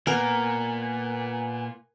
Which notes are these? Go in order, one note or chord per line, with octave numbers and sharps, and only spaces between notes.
A#2 B3 A#4 G#5